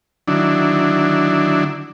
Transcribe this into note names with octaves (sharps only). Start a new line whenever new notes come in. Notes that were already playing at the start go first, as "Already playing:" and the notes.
D3 D#3 F#3 D4 E4